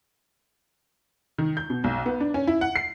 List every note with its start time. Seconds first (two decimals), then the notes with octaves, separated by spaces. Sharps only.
1.38 D#3
1.57 G6
1.70 B2
1.84 B1
2.06 B3
2.20 D4
2.34 C#4
2.47 E4
2.61 F#5
2.76 C7